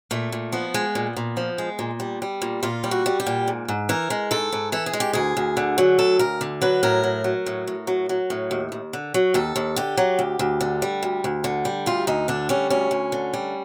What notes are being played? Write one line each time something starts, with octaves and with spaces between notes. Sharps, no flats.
A#2 A3
A#2
F3 B3
G#3
A#2
A#2
F3
G#3
A#2
G3
G3
A#2
A#2 F4
G3
F#4
G3
G4
A#2
G#2
G#2
E3 A#4
G#3
G#2 A4
G#2
E3 A4
G#4
G#3
G4
D2 G#4
D2
D3
F#3
D2 A4
D2 A#4
D3
F#3 B4
A2 A#4
F#3
F#3
A2
A2
F#3
F#3
A2
D#2
D#2
D3
F#3
D#2 A4
D#2
D3 G4
F#3
D2
D2
D3
G3
D2
D2
D3
G3
D2 F4
D2 D#4
D3 D4
G3 C#4
D2 C#4
D2
D3
G3